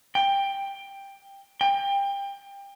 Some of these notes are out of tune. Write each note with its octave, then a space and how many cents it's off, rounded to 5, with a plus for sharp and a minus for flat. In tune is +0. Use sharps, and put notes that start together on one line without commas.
G5 +10
G5 +25